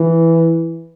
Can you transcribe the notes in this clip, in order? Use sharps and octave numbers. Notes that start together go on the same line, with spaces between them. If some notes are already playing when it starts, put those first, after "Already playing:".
Already playing: E3